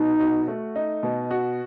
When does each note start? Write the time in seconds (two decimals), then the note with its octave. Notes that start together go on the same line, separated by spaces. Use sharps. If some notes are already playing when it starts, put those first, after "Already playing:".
Already playing: B2 D#4
0.20 F#4
0.48 A3
0.76 D#4
1.03 B2
1.31 F#4